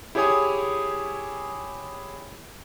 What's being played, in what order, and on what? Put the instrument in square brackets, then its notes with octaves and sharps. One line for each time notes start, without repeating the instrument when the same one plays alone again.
[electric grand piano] E4 G4 G#4 C#5 G#5 D#6